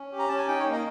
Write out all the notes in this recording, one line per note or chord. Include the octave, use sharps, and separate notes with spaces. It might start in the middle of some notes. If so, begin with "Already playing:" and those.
Already playing: C#4
G4
A#5
C#4 A5
G#5
D#4 G5
C#5
A#3
D#5